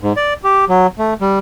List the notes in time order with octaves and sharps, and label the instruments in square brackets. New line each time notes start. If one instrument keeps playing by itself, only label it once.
[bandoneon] G#2
D5
G4
F#3
A3
G3